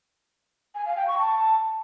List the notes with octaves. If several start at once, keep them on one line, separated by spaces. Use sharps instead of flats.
G#5
F5
G5
C#6
A5